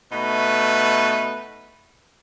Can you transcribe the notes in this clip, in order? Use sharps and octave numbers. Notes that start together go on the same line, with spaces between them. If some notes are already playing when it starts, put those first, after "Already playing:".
B2 A3 D#4 B4